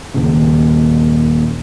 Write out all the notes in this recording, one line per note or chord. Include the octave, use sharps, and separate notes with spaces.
D#2 A#2 C#3